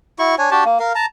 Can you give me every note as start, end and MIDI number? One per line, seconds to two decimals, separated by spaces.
0.19 0.35 64
0.19 0.35 66
0.19 0.35 85
0.39 0.50 62
0.39 0.50 73
0.39 0.50 80
0.51 0.64 62
0.51 0.64 66
0.51 0.64 67
0.51 0.64 81
0.65 0.78 58
0.80 0.93 70
0.80 0.93 77
0.95 1.06 81
0.95 1.06 82